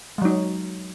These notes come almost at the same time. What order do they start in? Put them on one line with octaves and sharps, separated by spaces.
G#3 F#3 D#4